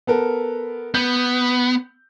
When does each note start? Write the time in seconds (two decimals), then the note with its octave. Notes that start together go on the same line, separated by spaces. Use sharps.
0.07 B3 A4 A#4
0.94 B3 G6